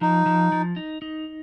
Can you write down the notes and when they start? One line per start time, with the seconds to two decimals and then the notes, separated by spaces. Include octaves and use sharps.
0.01 F3 D#4
0.26 F3
0.52 F3
0.76 D#4
1.02 D#4